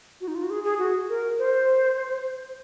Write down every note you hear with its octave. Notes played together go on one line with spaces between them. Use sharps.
F#4
D#4
F4
F#4
G#4
G#4
F#4
A#4
C5